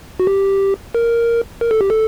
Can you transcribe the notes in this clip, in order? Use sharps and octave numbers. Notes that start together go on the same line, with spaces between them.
F#4
G4
A#4
A#4
A4
G4
A4